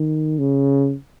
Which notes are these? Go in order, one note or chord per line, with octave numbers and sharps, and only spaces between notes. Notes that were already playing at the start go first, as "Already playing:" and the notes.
Already playing: D#3
C#3